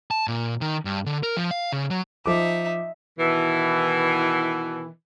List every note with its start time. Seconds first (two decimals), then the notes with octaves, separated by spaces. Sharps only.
0.11 A5
0.28 A#2
0.61 D#3
0.85 G2
1.06 D3
1.23 A#4
1.37 F3
1.51 F5
1.72 C#3
1.90 F#3
2.26 F3 D#4 E5 D6
3.19 B2 D#3 E3